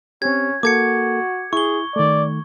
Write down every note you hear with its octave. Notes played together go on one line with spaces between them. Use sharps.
C4 C#4 G4 G#6
A#3 F#4 A4 D6 G#6 C#7
E4 G#4 C#6 G7
D#3 A3 D5